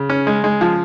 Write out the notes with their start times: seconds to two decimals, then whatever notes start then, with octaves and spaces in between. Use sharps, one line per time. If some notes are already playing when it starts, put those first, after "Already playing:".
Already playing: C#3
0.10 C#4
0.27 G#3
0.44 G#3
0.61 F3